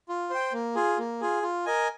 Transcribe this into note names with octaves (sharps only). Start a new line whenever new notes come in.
F4
C5 G5
A#3
F4 G#4
A#3
F4 G#4
F4
A#4 D#5 G#5